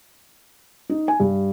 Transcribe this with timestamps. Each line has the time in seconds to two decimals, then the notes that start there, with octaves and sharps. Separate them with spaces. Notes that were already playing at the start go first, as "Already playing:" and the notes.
0.89 D#4
1.08 G#5
1.20 G2